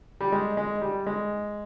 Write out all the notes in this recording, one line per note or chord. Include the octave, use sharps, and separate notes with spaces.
G3
G#3
G#3
G3
G#3